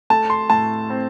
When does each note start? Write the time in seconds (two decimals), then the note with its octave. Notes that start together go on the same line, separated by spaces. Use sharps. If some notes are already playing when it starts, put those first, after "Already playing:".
0.10 A3 A5
0.30 C6
0.50 A2 A5
0.90 C4